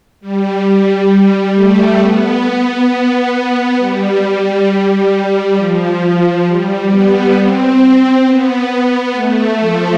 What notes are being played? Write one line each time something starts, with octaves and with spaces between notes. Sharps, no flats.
G3
G3
A3
B3
G3
G3
F3
G3
B3
C4
B3
B3
A3
F3